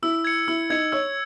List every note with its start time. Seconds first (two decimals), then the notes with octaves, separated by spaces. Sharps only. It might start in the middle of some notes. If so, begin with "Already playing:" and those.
0.02 E4 E6
0.25 G#6 C#7
0.48 E4 E6
0.70 D#4 G#6 C#7
0.92 C#5 E6